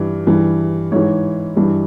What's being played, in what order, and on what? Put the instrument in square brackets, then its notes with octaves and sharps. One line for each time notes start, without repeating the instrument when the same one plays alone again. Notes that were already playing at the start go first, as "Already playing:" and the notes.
Already playing: [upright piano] G2 E3
G2 E3
G#2 E3 C#5
G2 E3